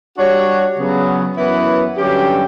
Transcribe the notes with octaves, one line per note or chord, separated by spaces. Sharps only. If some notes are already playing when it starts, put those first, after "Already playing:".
G3 D4 F#4 C#5
C#3 F#3 B3
F#2 E3 B3 E4 B4
G2 D3 F#3 C#4 G4